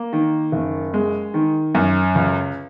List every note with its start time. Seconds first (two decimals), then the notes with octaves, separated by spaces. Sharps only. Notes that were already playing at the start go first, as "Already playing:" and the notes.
Already playing: A#3
0.13 D#3
0.52 F#1
0.94 G#3
1.34 D#3
1.75 F#2
2.15 C#2